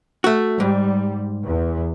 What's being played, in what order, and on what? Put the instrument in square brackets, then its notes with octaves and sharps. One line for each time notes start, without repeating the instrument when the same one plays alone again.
[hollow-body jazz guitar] A3 F#4
[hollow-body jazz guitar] G#2 [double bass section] G3
[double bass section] E2